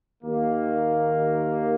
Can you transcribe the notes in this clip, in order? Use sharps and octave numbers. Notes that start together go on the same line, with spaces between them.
D#2 D#3 A#3